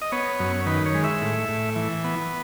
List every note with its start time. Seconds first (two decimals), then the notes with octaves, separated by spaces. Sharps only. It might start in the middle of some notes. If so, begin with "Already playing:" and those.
0.02 D#5
0.12 B3 C#5
0.39 F#2
0.66 D#3 B4
0.86 C#5
0.95 G#3
1.04 E5
1.22 A2
1.49 A2
1.76 E3
2.04 B3